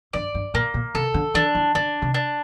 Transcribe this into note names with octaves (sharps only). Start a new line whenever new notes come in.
G2 D5
G2
A#2 A#3
A#2
C3 A4
D3
E3 D4
E3
D3 D4
C3
D4